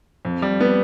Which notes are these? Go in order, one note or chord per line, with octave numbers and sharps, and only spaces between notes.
F2
G3
B3